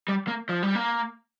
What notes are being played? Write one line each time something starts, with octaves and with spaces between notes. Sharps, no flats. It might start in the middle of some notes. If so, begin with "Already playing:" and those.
G3
A#3
F3
G3
A#3